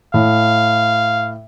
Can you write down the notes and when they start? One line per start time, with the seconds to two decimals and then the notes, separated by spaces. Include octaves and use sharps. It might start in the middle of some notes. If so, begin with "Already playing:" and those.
0.14 A2 F5